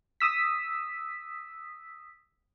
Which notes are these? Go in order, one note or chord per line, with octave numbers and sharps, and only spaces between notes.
D#6 E6 B6